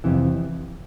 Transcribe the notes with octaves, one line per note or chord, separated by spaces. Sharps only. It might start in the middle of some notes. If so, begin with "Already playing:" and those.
F2 C3 E3